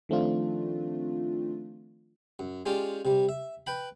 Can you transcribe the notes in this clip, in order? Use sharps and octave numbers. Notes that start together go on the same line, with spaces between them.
D#3 F3 A3 C4 D4 F4
F#2
G#3 C#4 F4 G4 D5
C3 G3
E5
B4 G5 B5